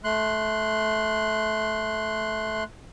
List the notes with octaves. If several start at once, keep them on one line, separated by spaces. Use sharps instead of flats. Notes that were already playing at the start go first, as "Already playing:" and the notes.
A3 C6 F#6